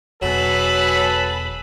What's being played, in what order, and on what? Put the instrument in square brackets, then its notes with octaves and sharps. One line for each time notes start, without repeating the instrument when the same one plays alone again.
[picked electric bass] E1 B2 [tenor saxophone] F#3 [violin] G#4 B5 [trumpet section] A4 B4